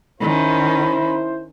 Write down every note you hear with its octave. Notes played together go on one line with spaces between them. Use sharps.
D#3 C#4 E4 C5 B5